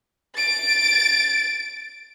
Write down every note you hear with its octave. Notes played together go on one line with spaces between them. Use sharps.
A6 D7